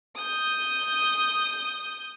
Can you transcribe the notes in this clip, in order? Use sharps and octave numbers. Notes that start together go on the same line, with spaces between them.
D#6 G6